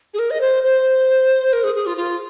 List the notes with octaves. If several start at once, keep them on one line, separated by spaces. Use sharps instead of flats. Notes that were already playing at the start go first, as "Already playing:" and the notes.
G#4
A#4
D#5
C5
C5
A#4
G#4
G#4
F4
F4